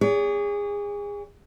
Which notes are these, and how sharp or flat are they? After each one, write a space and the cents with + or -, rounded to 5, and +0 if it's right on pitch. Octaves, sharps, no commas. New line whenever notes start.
G#4 -30 C#5 +40